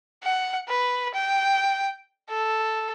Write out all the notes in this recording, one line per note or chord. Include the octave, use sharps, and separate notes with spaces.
F#5
B4
G5
A4